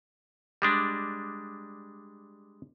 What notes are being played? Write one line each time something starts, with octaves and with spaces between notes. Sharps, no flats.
G3 G#3 D4